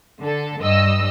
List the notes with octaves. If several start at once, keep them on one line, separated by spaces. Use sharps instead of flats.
D3 A4
G2 D#5 E6